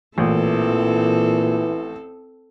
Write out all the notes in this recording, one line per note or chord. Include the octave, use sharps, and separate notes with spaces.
A1 A#2 E3 C4 A4